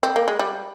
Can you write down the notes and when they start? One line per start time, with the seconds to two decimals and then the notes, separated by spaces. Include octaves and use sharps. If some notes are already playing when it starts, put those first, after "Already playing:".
0.03 C4
0.16 A#3
0.28 G#3
0.39 G3